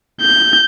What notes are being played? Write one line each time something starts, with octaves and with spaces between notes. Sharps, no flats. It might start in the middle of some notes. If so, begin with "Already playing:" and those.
G6